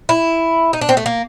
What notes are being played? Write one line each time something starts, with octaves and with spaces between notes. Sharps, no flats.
E4
D#4
D4
C4
A3
A#3